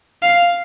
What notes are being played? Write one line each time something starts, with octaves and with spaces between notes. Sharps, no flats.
F5